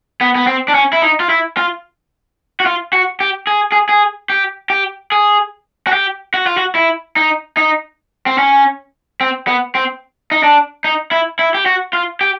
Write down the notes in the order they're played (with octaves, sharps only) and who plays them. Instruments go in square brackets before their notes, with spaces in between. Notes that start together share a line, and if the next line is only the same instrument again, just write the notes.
[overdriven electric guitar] B3
B3
C4
D4
C#4
E4
D#4
F4
E4
F4
F#4
F4
F#4
G4
G#4
G#4
G#4
G4
G4
G#4
F#4
G4
F#4
F4
F#4
E4
D#4
D#4
C4
C#4
C4
B3
C4
D#4
D4
D#4
E4
E4
G4
F#4
F4
G4